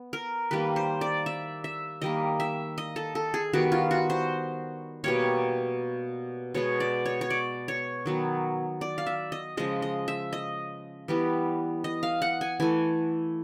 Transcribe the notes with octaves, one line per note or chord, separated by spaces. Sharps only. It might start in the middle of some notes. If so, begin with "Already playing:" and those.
Already playing: B3
A#4
D#3 G3 A#3 B4
C5
D5
E5
E5
D#3 G3 A#3 D#5
E5
D#5
A4
A4
G#4
D#3 G3 B3 F#4
F4
F#4
C5
B2 G3 A#3 C#5
B2 G#3 B3 C#5
D5
C#5
C#5
D5
C#5
D#3 F#3 B3
D5
F5
E5
D#5
C#3 F3 G#3 D#5
D#5
E5
D#5
E3 G3 B3
D#5
F5
F#5
G#5
E3 A3 G#5